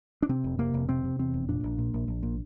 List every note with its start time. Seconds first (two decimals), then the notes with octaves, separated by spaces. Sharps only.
0.22 D4
0.29 C3 C4
0.44 F1
0.59 C3 A#3
0.74 F1
0.89 C3 C4
1.04 C3
1.19 E2 C4
1.34 F1
1.49 A#2 D4
1.64 A#1
1.78 A#2
1.94 A#1
2.08 A#1
2.23 A#2